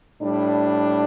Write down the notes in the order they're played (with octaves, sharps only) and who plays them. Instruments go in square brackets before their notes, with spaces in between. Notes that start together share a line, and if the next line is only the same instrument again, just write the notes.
[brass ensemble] A2 G3 D4